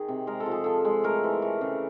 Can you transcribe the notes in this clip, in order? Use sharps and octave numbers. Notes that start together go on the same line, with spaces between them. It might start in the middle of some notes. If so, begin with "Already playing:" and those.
Already playing: D#3 G#4
C3
G#3 A#4
A4
F3
G#4
F3 A4
G#3
A3 A#4
E3
A3
C#3